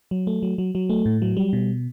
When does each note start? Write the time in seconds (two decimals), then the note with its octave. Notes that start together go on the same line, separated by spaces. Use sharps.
0.11 F#3
0.27 A3
0.43 F#3
0.58 F#3
0.75 F#3
0.90 A3
1.06 A2
1.22 F#3
1.37 G3
1.53 B2